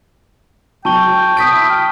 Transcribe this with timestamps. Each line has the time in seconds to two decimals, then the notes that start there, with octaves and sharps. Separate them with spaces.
0.85 F#3 G5 A5 C#6 G7
1.37 D#6 G6 B6 D7
1.52 E4
1.70 G5 F6